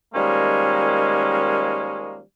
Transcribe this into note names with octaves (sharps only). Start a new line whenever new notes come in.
D#3 F3 G3 G#3 A#3 C#4